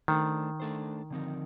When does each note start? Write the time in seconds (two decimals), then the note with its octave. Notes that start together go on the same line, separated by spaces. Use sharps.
0.08 D#3 A3 D4 A4 C5
0.60 A3 D4 A4 C5
1.10 D3 F3 C4 D#4 A#4